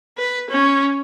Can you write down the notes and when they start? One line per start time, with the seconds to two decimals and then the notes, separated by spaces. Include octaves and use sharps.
0.18 B4
0.50 C#4